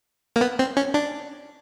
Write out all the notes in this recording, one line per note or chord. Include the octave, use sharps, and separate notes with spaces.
A#3
B3
C4
C#4
D4